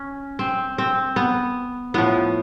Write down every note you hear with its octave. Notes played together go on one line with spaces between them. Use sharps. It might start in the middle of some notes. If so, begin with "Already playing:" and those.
Already playing: C#4
C4
C4
B3
A2 F3 B3